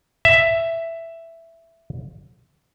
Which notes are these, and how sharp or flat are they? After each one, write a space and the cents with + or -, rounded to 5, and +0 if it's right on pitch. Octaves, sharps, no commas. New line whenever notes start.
E5 +5